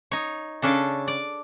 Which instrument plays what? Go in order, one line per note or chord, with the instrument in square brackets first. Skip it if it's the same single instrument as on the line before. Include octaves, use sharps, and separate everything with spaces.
[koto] D#4 C#5
C#3 C#4 D4 A4
D5